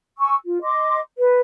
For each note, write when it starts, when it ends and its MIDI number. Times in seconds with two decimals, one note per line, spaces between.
0.18 0.35 80
0.18 0.35 85
0.18 0.35 88
0.46 0.62 65
0.63 1.00 75
0.63 1.00 84
0.63 1.00 86
1.18 1.41 71